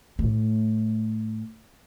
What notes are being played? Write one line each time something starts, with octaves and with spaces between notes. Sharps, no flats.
A2 A3